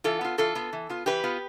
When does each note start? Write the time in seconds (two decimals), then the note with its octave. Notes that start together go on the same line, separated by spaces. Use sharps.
0.04 E3 F4 A4
0.21 B3 F4
0.38 E3 F4 A4
0.55 B3 F4
0.73 E3
0.89 B3 F4
1.06 E3 G4 B4
1.24 B3 F4